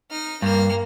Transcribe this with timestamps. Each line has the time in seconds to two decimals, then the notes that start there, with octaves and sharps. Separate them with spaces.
0.11 D#4 F6
0.42 G2 A#3 F6